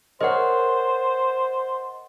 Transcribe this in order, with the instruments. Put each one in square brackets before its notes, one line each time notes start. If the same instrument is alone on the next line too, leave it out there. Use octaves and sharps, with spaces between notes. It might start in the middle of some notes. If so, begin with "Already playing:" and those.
[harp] A#4 C#5 [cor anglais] C5 [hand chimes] D#5 F#5